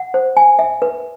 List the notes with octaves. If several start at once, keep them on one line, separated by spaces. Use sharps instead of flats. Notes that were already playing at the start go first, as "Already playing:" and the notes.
Already playing: F#5
C5
G#5
E5
B4